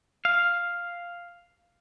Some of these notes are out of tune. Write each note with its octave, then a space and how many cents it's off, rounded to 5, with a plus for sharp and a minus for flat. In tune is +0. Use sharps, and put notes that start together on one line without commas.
F5 +0